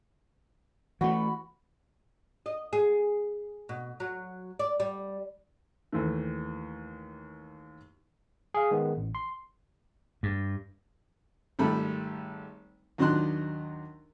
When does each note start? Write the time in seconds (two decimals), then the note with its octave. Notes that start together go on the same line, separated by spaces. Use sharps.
1.01 E3 A3 F#4 B5
2.46 D#5
2.73 G#4
3.69 B2
4.00 F#3
4.60 D5
4.80 G3
5.92 D#2 E3 A3
8.54 G#4 F5
8.71 D#3 G#3 B3
8.97 A1
9.15 C6
10.23 G2
11.59 G#1 G3 A3 B5
12.98 D#2 F#3 D4 D#4 C6 F#6